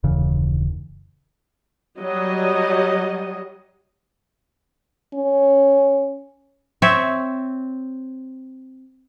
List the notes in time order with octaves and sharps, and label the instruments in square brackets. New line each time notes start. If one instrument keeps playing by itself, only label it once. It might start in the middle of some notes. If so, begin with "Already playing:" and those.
[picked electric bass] D#1 F#2 C#3 E3
[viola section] F#3 G3 D#5
[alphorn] C#4
[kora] C4 C#5 E5